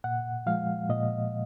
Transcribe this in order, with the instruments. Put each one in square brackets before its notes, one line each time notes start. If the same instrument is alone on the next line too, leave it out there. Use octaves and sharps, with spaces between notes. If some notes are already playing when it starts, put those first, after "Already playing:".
[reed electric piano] A#2 F#5
F3 G#3 F5
A#2 D#5